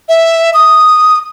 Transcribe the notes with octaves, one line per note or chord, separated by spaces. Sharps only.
E5
D#6